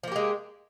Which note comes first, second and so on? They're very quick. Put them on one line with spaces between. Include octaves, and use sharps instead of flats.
F3 A#3 G4 G#3